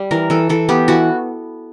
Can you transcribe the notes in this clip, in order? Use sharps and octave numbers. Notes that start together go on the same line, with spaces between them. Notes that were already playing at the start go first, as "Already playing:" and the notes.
Already playing: G3
E3 A#4
E3 A4
E3 A4
B3 G4
E3 F#4